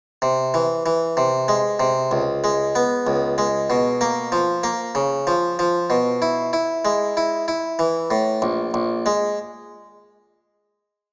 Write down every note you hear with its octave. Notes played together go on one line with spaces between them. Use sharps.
C3
E3
E3
C3
G#3
C3
C#2
G#3
B3
C#2
G#3
B2
A#3
F3
A#3
C#3
F3
F3
B2
E4
E4
G#3
E4
E4
E3
A2
A#1
A#1
G#3